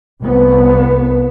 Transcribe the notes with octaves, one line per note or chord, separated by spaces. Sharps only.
C2 B3